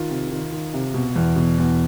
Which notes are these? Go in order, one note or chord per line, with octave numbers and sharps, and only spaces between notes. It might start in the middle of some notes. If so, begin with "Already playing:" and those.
Already playing: D#3 F4
C3
D#3
D#3
C3
B2
E2
B2
E2